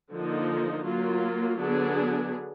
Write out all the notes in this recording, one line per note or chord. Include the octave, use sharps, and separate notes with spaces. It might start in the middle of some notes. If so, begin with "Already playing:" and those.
D3 F3 A#3 D#4
F#3 A#3 F4
D3 F#3 B3 D4 G#4